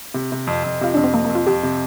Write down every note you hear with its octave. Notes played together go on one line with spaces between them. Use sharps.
C3
C3
F2
F2
C3 F4
F2 D4
C4
F2 A#3
A#3
F2
F4
F2 G4
C3